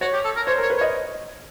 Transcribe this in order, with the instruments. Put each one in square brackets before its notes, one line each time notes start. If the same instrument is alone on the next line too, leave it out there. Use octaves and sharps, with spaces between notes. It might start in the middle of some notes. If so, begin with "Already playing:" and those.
[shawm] F#4 [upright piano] C#5
[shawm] G4
A4
A#4
[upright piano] C5 [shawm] C#5
[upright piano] A#4
[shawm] C#5
[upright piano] B4
[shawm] C#5
[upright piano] D#5